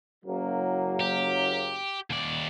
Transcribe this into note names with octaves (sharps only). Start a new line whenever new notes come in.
F#1 F#3 A#3
G4
D#2 D5